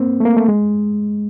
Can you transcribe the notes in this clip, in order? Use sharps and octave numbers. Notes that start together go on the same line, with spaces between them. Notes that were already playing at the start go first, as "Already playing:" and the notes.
Already playing: A#3 C4
A3
A#3
A3
G#3